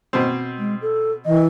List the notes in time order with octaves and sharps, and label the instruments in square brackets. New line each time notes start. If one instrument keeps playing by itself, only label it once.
[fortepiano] B2 C4
[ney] G#3
A4
[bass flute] E3 [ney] D#5